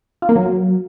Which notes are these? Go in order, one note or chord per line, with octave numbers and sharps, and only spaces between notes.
F4
A#3
F#3